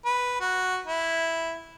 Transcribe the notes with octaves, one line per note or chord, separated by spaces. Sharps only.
B4
F#4
E4